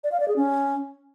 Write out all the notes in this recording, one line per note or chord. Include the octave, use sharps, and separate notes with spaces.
D5
F5
D5
G#4
C#4